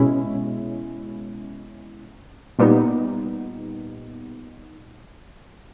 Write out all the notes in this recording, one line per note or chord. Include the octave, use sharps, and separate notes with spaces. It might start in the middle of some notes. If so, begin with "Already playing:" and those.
Already playing: B2 G#3 C#4 E4
A#2 G3 B3 D#4